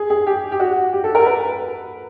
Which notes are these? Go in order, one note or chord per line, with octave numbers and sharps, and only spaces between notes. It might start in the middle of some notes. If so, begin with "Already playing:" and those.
Already playing: G#4
G#4
G4
G4
F#4
G4
A4
A#4
B4